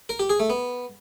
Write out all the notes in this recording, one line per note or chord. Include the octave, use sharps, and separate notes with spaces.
A#4
G4
G#4
A3
B3